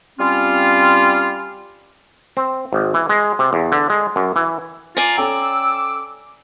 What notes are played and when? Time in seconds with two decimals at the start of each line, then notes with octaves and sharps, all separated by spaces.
0.19 G3 C4 C#4 F4
2.37 C4
2.73 G#1
2.94 E3
3.09 G#3
3.39 C3
3.53 E2
3.72 D3
3.90 G#3
4.16 F#2
4.36 E3
4.97 F4 D5 G#5 A#5
5.18 C#4 A4 G5 D6 E6